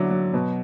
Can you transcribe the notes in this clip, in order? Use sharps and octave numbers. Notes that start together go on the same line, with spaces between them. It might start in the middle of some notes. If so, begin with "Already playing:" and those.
Already playing: D3 F#3 E4 D6
F#3
B2